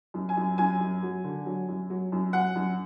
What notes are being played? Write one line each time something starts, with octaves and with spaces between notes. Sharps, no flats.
F#2
G#5
F#2
F#2 G#5
F#2
F#3
D3
F#3
F#2
F#3
F#2
F#3 F#5
F#2